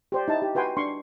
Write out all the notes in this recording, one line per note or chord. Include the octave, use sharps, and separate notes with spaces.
G4 C5 D5
D#4 E4 A5
G4
F#4 B4 G5 G#5 C6
D4 C6 C#6